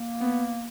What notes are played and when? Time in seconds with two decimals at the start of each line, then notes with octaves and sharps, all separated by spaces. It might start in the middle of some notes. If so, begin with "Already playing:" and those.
Already playing: A#3
0.21 B3